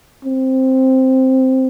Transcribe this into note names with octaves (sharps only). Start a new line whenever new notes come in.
C4